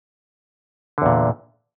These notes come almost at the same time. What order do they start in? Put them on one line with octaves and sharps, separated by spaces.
D3 E2 A#2